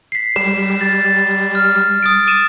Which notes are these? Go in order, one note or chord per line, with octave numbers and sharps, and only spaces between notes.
B6 C7
G3 E7
A6
F6
D#6 A6 D7
D6 D#7 E7